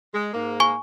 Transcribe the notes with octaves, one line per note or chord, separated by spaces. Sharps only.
G#3
G#2 A#3
G#5 C#6